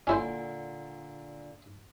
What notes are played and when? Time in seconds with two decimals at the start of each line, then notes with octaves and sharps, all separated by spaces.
0.07 A#2 D3 C#4 E4 C5